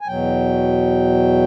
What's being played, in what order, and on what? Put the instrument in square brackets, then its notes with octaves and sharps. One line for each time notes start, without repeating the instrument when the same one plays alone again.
[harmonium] G#5
E2 B2 F#3 G5